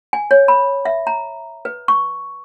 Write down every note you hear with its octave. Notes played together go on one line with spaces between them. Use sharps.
G#5
C#5
B5
E5
A#5
B4
C#6